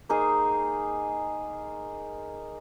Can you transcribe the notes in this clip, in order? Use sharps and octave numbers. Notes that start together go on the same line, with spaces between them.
A#3 D#4 G#4 C5